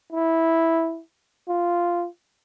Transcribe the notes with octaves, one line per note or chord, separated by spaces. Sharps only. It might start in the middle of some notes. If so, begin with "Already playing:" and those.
E4
F4